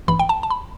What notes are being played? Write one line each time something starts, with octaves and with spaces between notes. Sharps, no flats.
A1 G2 E3 B5
G5
A5
A5
B5